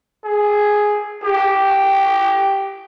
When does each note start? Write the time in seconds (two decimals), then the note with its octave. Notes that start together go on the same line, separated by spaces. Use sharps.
0.24 G#4
1.23 G4